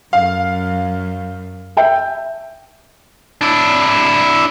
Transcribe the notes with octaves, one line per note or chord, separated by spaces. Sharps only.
F#2 F5
E5 G5
D4 E4